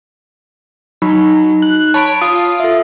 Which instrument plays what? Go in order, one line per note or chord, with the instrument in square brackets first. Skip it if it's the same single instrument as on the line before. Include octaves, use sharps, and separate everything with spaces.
[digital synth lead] F#3 [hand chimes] D#4 B5
[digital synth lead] F#6
[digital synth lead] C#5 [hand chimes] A5 B5 D7
[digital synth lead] F4 [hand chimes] D#6
[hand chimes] A4 E5